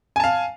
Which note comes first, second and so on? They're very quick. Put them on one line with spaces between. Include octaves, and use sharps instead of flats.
G#5 A5 F5